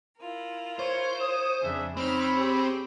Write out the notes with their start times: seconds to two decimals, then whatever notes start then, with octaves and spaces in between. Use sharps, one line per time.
0.19 E4 F4 A#4
0.79 C5 C#5
1.21 C#5 D#6
1.62 F2 C#3 D4 G#4 E5
1.97 C4 D#4 C#5 B5 F6
2.33 G4 G#4